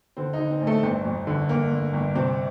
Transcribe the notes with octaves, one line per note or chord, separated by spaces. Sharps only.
D3 C4
D#4
D3
C4
A1
A3
G1 C4
F2
D3
G1 A#3
G1
G1
C3 C4